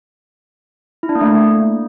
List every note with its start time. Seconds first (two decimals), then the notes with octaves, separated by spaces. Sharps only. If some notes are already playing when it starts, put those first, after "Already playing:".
1.03 E4
1.09 D4
1.15 A#3
1.21 A3